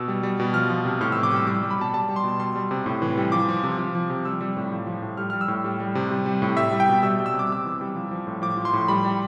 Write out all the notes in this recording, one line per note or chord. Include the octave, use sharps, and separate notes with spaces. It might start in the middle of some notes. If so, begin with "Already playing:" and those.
Already playing: B2 E6
G3
G3
B2
F3 F6
F3
C3
A2 F6
E3 E6
D6
G3 E6
G3 D6
G3
B5
B2 A5
G3 A5
G3
C6
B2
G3 C6
G3
C3
A2
E3
G3
F3 D6
F3
C3
F3
F3
C3
G3 E6
G3
A2
F3
F3
A2
G3 F6
G3 F6
E6
A2
G3
G3
C3
G3
G3
A2
G3 E5
G3
G5
B2
G3 E6
G3
E6
C3
D6
C3 E6
E3
G3
F3
F3
A2
F3 D6
F3
C6
A2
G3 B5
G3